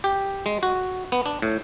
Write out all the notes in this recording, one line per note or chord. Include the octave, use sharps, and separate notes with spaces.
G4
G#3
F#4
B3
D4
A2